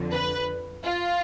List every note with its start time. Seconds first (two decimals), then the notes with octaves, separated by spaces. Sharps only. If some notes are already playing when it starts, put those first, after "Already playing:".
Already playing: F2 D3
0.14 B4
0.84 F4